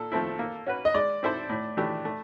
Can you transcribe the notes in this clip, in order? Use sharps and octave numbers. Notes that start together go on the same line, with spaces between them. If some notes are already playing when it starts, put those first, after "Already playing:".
Already playing: A#2 A4
F3 A3 C4 E4
A#3
C#4 F#4 B4
D#5
G#3 D5
C4 E4 A4 C5
A2
E3 A3 D4 G4
A3